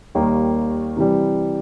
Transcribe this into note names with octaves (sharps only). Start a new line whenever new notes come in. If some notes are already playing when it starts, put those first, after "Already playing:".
D#2 D#3 G3 A#3
C3 E3 G3